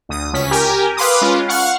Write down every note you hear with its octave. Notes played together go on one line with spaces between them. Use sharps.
D2 D#6
C#2 C#4 B6
G4 A#4 G5 G#5
B4 F5 B5 C6 D6 D#6
G#3 C#4 F4
F5 F#5 C#6 F6 F#6